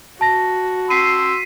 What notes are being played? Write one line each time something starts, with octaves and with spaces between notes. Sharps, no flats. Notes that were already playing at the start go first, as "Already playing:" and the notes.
F#4 A5 A#6
C6 E6 B6 C7 D#7